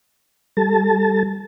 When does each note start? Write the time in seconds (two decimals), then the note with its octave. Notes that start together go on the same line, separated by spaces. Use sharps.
0.57 G3 A4 A5